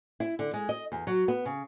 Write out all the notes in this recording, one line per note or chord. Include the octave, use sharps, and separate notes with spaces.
E4
D3
G#3
D#5
E2
F#3
B3
C#3